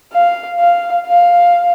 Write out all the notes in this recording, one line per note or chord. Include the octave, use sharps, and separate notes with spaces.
F5
F5
F5